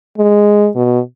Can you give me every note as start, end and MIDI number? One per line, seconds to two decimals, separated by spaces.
0.18 0.68 56
0.76 0.99 47